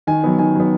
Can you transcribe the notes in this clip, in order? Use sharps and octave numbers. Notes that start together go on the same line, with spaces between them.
D#3 G#5
F#3 B3
D#3 G#5
F#3 B3